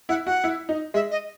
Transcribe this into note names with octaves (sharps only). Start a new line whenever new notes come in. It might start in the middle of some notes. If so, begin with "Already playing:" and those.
E4 F#5
F#4 F#5
E4
D#4
G#3 E5
D#5